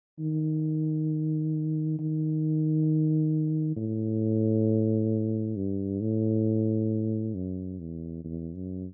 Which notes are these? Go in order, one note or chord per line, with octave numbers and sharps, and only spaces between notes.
D#3
D#3
A2
G2
A2
F#2
E2
E2
F#2